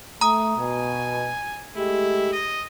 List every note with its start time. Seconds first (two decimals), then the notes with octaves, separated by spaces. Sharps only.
0.21 A3 A#5 D#6
0.57 B2 G#5
1.77 G#3 A3 E4 G4
2.33 D#5